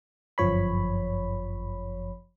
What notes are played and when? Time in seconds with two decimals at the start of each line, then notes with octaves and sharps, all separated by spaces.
0.38 G1 F#2 F3 C#5 B5